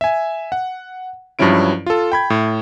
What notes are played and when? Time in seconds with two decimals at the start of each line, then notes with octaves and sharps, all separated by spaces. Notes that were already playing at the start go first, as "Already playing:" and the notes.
0.01 E5 G#5
0.52 F#5
1.39 G2 F3 F#3 C#4 E4 D7
1.86 F4 A4
2.12 G5 B5 G#6
2.30 A2